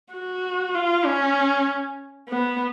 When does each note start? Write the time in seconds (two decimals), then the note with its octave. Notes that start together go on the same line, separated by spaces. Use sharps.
0.12 F#4
0.74 F4
1.05 C#4
2.28 B3